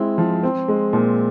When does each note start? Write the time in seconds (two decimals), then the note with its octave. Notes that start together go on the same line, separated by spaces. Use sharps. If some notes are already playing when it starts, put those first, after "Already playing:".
Already playing: G#3 C4 E4
0.18 F3
0.43 C4
0.68 G#3
0.93 A#2